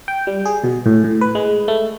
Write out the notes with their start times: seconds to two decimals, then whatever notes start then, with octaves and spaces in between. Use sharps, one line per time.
0.08 G5
0.27 G3
0.45 G#4
0.64 B2
0.86 A2
1.04 A2
1.21 B4
1.35 G#3
1.68 A3